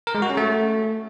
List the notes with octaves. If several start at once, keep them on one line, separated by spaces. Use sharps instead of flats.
A#4
G#3
F#4
C#4
A3